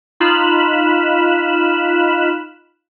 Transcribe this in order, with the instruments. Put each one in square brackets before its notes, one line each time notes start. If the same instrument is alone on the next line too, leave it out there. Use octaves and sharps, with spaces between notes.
[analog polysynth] D#4 F4 B5 F6 F#6 E7